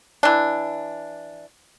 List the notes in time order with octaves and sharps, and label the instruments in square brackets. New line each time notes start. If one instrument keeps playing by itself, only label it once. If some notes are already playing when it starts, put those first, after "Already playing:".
[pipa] E3 D4